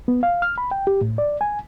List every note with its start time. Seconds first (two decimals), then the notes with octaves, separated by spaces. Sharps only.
0.08 B3
0.23 F5
0.42 F6
0.58 B5
0.71 G5
0.87 G4
1.01 A2
1.18 D5
1.41 G#5